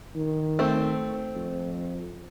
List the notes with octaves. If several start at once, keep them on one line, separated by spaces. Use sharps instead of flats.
D#3
A3 C4
F2